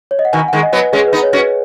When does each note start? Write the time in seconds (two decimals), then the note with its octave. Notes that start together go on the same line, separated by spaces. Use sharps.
0.11 C#5
0.19 D#5
0.25 F#5
0.33 B2 D#3 G#5
0.48 D#3 G#3 F#5
0.63 D#5
0.73 F#3 B3
0.77 B4
0.93 G#3 C#4 G#4
1.07 B4
1.13 B3 D#4
1.23 C#5
1.33 C#4 F#4
1.38 B4